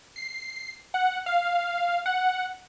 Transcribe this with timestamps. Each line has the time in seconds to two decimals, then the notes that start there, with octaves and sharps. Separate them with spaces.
0.16 C7
0.94 F#5
1.26 F5
2.06 F#5